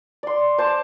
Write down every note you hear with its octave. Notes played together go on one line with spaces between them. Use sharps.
D5 C6
C5 A5 D6